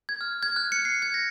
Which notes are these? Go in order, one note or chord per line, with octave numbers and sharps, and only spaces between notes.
G#6
F6
G#6
F#6
C#7
C7
G#6
A#6